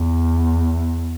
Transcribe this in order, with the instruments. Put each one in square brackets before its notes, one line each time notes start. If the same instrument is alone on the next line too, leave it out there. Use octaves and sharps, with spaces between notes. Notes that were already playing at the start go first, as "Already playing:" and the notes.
Already playing: [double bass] E2